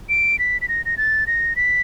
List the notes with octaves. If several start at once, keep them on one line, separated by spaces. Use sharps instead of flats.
D7
B6
B6
A#6
A#6
A6
A#6
B6